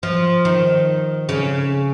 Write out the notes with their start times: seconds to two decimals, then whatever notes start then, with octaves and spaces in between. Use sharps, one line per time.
0.03 F3
0.45 D#3
1.29 C#3